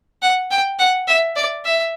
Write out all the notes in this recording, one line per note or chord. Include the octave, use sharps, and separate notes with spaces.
F#5
G5
F#5
E5
D5
E5